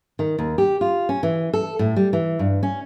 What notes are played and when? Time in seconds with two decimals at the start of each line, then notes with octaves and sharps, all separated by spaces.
0.19 D#3
0.39 D#2
0.58 G4
0.81 F4
1.09 C#4
1.23 E3
1.53 A4
1.79 A2
1.96 G3
2.13 E3
2.39 G2
2.63 C#4